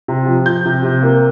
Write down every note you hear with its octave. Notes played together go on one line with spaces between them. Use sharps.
C3
F3
F3 G6
C3
C3
A#3